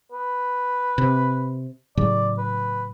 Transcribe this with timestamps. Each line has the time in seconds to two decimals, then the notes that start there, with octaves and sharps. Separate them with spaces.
0.12 B4
0.98 C3
1.97 A2 C#3 F#3 D5
2.38 B4